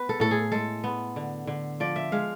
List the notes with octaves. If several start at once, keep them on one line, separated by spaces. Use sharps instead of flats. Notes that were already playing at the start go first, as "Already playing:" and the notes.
Already playing: B3 B4
A4
A2 A4
G#4
G#3 A4
B3
D3
D3
F3 D5
E5
G#3 F5